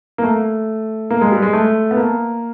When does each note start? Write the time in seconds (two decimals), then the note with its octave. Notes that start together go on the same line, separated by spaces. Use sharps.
0.18 A#3
0.23 A3
1.10 A#3
1.21 G#3
1.31 G3
1.42 G#3
1.53 A3
1.91 B3
1.97 A#3